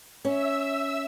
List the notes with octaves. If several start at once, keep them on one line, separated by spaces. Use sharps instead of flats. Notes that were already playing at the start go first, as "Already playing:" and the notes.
C#4 E5 E6